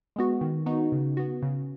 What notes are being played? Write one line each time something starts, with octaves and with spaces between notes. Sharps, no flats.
G#3 B3 F#4
D#3
B3 D#4 F#4
C#3
B3 F#4
C#3